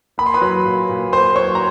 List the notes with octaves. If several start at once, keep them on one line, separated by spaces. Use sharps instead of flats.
A#3 B5
C6
B4 B5
F#3
A#2
A#2
A#3 C5 C6
F#3 C#5 C#6
A#5